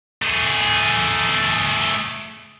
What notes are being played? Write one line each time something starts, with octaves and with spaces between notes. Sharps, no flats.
A3 G#4